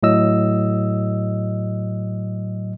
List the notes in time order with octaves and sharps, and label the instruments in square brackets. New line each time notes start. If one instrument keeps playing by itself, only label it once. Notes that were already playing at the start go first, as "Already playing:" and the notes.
[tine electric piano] A2 F#3 D#5 E6